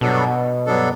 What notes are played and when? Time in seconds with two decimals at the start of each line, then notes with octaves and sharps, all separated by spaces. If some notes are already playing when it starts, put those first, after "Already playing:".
0.01 G2 B2 F#3 B3 D4 A4
0.66 G2 F#3 B3 D4 A4